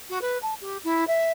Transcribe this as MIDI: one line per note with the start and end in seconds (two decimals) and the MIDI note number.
0.10 0.21 66
0.21 0.38 71
0.42 0.54 81
0.61 0.78 67
0.84 1.04 64
1.07 1.31 76